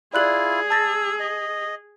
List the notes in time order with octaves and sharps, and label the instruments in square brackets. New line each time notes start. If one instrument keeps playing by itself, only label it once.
[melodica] E4 F4 [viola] G#4 [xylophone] D5 F#6 F#7
[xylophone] A5 A6 A#6 [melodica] E6
[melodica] D#5